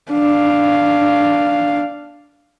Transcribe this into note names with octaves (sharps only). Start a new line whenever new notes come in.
D4 F5